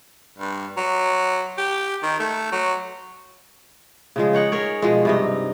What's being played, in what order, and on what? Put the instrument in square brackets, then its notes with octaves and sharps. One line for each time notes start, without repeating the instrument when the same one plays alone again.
[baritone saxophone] G2
F#3
G4
D#3
A3
F#3
[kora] C#3 F3 G#3
D#4 C#5 F#5 G5
G#4 A#4 C#5
B2 F3 G#3
G2 C3 D#4